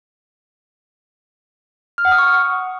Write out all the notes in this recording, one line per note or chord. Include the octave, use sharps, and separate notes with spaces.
F6
F#5
D#6
C#6